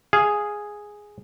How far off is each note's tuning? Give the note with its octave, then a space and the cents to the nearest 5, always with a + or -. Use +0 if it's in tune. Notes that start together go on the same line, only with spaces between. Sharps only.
G#4 +0 F5 +0